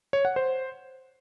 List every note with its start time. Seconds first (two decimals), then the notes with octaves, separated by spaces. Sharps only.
0.13 C#5
0.25 F#5
0.36 C5